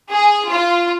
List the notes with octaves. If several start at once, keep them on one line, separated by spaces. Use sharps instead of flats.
G#4
F4